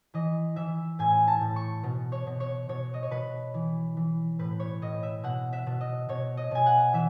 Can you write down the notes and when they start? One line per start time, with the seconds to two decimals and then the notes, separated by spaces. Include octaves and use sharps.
0.14 E3 D#5
0.56 E3 E5
0.99 A2 G#5
1.28 A5
1.41 A2
1.56 C#6
1.84 B2
2.12 C#5
2.27 B2
2.40 C#5
2.69 B2 C#5
2.94 D#5
3.02 C#5
3.11 B2 B4
3.54 E3
3.97 E3
4.39 A2 B4
4.60 C#5
4.82 A2 D#5
5.03 E5
5.24 B2 F#5
5.53 E5
5.66 B2
5.81 D#5
6.09 B2 C#5
6.37 D#5
6.51 B2 G#5
6.66 F#5
6.93 E3 E5